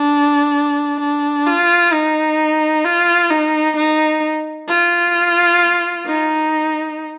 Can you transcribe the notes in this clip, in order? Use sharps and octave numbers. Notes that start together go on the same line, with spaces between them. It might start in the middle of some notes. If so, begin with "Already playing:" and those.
Already playing: D4
D4
F4
D#4
F4
D#4
D#4
F4
D#4